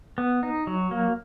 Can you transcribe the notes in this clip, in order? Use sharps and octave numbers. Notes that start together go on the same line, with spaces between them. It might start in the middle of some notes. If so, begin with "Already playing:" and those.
B3
D#4
F#3
A#3